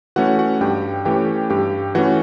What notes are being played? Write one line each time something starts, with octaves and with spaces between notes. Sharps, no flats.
E3 A3 C#4 F#4 F#5
F#4 F#5
G2 G4 G5
E3 A3 C#4 G4 G5
G2 G4 G5
E3 A3 C#4 F#4 F#5